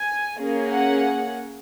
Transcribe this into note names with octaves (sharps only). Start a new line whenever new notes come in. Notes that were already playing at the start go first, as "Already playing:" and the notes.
Already playing: G#5
A#3 C#4 G#4
F#5